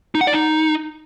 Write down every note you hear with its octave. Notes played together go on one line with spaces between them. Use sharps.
D#4
F#5
D5
D#4